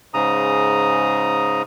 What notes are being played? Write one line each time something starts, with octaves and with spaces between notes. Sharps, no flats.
G#2 C#3 A#5 D#6